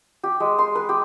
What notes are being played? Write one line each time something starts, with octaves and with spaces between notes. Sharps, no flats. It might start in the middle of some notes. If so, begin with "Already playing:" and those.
G4
G#3
C6
B4
G4